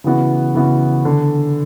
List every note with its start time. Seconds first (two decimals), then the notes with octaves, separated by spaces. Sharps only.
0.04 C#3 E3 B3 F#4
0.55 C#3 E3 B3 F#4
1.05 D3